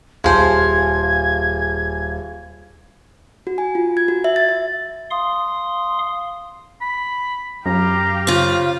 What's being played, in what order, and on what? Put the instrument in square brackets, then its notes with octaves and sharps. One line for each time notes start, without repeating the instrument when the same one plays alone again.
[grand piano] D#1 [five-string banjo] F3 C5 [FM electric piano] G#4 F5 G#5 [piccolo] G#6
[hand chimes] F#4
G#5
F4
G#6
F#4
E5
A6
E5
[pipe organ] F5 C6 D#6
[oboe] B5
[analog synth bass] F#2 [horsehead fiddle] G4 F5 [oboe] A#5
[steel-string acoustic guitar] C#3 F4 [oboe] C5